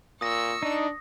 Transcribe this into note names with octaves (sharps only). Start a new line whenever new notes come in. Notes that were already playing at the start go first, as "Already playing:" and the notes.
A#2 C#6 D#6 E6 A#6
D4 D#4